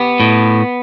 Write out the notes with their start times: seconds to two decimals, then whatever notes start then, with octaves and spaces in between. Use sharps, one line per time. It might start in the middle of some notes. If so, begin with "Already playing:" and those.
Already playing: B3 G4
0.20 A2